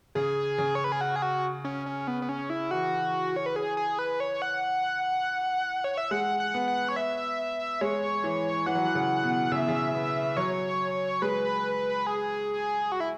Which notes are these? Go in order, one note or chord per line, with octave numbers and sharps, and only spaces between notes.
C#3 G#4
C#3
C#5
B4
G#4
F#4
G#4
F#4
C#4
C#4
B3
B3
C#4
E4
E3 F#4
C#5
B4
G#4
G#4
B4
C#5
F#5
C#5
E5
G#3 F#5
F#5
B3
F#5
C#5
E5
G#3 C#5
E3
E3 F#5
F#3
E3
C#3
B2
C#3 E5
B2
C#3
B3
F#3 C#5
G#3 B4
G#4
F#4
E4